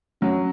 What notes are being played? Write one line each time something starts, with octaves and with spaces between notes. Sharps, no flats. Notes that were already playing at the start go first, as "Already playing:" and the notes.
F#3 C#4